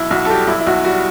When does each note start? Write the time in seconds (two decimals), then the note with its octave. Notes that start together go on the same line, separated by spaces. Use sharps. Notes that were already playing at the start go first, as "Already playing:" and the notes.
Already playing: B1 E4
0.11 B1 F#4
0.25 A4
0.30 G3 G4
0.47 B1 E4
0.60 E4
0.67 B1 F#4
0.84 G3 F#4